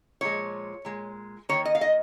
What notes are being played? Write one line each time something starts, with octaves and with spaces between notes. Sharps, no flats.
A#2 F3 G#3 C#5
A#2 G#3
D#3 A#3 C#5
D#5
F5
D#5